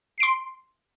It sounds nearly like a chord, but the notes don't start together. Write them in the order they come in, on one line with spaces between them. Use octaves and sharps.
C7 D7 C6